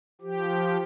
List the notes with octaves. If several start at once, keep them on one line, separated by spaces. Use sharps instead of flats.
F3 G4